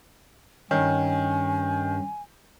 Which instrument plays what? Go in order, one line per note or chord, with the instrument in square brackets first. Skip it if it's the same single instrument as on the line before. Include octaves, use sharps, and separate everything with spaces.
[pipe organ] G2 [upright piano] D#3 [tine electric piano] C#4 [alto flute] G#5